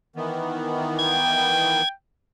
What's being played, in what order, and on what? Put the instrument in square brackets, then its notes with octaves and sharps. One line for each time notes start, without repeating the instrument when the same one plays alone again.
[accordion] D#3 E3 B3
[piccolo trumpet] G5 [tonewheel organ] G#6